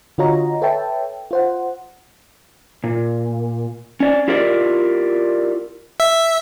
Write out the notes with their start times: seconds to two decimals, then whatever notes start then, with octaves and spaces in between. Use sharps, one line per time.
0.18 D3 F4 F#4 C#5 D#5 A#5
0.62 A4 B4 C#5 E5 G5 A5
1.31 F4 C5 F#5
2.84 A#2
4.00 C#4 D5
4.28 E4 F4 G4 A#4 D5
6.00 E5